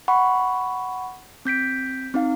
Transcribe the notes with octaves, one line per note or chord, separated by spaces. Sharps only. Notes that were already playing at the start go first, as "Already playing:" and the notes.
F#5 B5 C#6
C4 G6 B6 D7
C4 D#4 F5